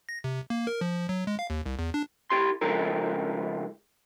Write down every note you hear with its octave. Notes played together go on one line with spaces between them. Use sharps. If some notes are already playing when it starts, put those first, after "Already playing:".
A#6
C3
A#3
A#4
F3
F#3
G#3
F5
D#2
C2
E2
D4
E4 G4 C6
C#3 F3 G#3 E4 A4 A#4